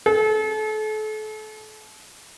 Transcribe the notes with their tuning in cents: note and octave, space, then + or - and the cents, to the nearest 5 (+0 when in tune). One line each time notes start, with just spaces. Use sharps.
A4 -35